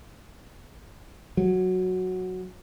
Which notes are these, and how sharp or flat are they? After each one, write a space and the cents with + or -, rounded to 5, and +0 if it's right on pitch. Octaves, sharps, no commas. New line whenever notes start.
F#3 -5